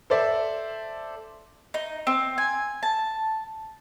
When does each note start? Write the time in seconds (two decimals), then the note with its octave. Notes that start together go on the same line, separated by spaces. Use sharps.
0.10 A4 C5 D5 E5
1.74 D#4
2.07 C4
2.38 G#5
2.83 A5